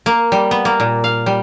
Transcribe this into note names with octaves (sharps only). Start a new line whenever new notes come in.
A#3
G3
B3
A#3
A#2
F5
G3